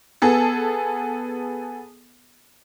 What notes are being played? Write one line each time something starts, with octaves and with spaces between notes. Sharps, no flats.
B3 G#4 A4